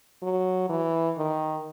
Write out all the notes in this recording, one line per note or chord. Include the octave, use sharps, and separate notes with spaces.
F#3
E3
D#3